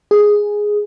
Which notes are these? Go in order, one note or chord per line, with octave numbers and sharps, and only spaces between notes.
G#4